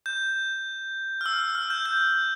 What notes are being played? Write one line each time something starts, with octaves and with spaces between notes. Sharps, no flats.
G6
F6
E6
F6
G6
G6